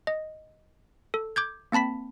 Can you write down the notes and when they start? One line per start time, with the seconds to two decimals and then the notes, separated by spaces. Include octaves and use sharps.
0.07 D#5
1.14 A4
1.36 D6 G6 G#6
1.72 A#3 C4 A5 B5 B6